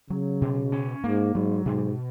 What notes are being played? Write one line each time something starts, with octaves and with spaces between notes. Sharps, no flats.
C#3 F#3
B2
C#4
G#2 A#3
G#2 F#3
G#2 B2